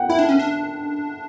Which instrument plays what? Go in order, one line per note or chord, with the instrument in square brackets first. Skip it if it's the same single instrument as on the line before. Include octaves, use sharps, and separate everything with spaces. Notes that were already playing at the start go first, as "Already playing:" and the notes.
Already playing: [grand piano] F#5 G5
[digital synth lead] E4 [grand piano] E5
[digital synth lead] D4
C#4
D4